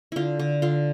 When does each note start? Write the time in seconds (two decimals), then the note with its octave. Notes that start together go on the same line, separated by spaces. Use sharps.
0.12 D3 E4 F4
0.39 D3
0.62 D3 F4